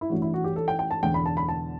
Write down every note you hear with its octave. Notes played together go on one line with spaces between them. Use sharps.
E4
A1 G2 E3 F#4
E4
F#4
G4
A4
G5
G5
A5
E1 E2 D3 G5
B5
A5
B5
A5